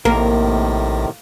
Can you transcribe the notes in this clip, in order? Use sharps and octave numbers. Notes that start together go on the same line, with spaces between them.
A#1 A2 C3 D#3 A#3 A#4